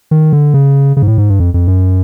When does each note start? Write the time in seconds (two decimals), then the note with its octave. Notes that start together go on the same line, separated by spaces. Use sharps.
0.11 D#3
0.33 D3
0.54 C#3
0.97 C#3
1.02 G#2
1.08 A2
1.18 G#2
1.29 G2
1.40 F2
1.54 F2
1.68 F#2